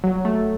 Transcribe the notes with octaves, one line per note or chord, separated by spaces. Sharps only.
F#3
A3